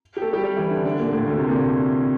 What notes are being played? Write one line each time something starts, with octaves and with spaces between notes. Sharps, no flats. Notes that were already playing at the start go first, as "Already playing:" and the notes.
G4
A3 A4
G3 G4
G3 G4
E3 E4
D3 D4
D3 D4
A#2 A#3
A2 A3
D2 D3
C3
A#2